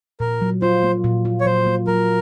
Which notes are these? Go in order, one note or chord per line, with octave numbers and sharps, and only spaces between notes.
A#2 A#4
F#3
F4 C5
A#3
A#2
F4
C#5
F#3 C5
A#3
F#3 A#4